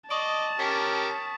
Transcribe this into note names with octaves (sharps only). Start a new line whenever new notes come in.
D5 D#5 A5 C#6 D#6 D7
C#4 G4 A#4 C#6 B6